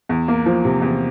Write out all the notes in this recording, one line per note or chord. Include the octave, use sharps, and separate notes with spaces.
E2
A#3
F3
C3
E2